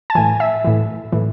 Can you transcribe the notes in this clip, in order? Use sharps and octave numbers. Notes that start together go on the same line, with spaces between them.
A5
A2 E3 G#5
E5
A2 E3
A2 E3